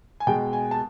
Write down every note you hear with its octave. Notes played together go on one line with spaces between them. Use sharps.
G#5
B2 G#3 G5
G#5
A5